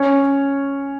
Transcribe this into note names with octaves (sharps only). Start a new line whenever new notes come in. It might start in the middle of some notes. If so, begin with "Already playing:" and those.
Already playing: C#4 C#5